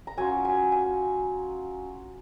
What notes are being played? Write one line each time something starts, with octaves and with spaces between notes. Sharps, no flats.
A#5
F#3 C#4 F4 G#5
G#5
G#5